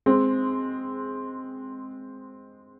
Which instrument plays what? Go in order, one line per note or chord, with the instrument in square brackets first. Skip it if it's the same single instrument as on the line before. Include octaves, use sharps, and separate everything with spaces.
[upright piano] G#3 C4